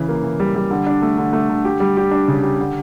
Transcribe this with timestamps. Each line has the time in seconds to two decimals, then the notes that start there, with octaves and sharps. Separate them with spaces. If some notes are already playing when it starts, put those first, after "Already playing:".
Already playing: C#3 E3
0.09 A#3
0.23 E3
0.40 G3
0.55 G3
0.71 D3
0.86 D4
1.02 A3
1.18 D3
1.33 A3
1.49 D3
1.65 G4
1.80 G3
1.97 G4
2.11 D4
2.28 C#3
2.43 G4
2.60 D3